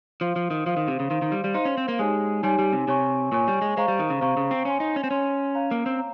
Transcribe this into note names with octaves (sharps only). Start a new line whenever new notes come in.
F3 C5 F5 C6
F3
D#3
F3 C5 F5 C6
D#3
C3
C#3
D#3 C5 F5 C6
D#3
G3
G3
D#4 C5 F5 C6
C#4
C4
A#3
G#3 D#4 G4 C#5 G#5
G3 D#4 G4 C#5 G#5
G3
C3
C3 C#5 G#5 C#6
A#2 C#5 G#5 C#6
G3
G#3
G#3 C5 F5 A#5 C#6
G3
D#3
C#3
C3 C5 F5 A#5 C#6
C#3
C4
C#4 C#5 G#5 C6
D#4
C#4
C4
C#4 C#5 G#5 C6
C#5 F5 A#5
A#3
C4
A#5